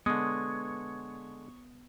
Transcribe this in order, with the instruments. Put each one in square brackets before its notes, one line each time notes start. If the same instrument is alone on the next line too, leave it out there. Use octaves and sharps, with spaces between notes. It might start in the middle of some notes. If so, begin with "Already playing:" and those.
[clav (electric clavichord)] D3 G#3 [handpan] B3 [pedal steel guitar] C#5 [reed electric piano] D#6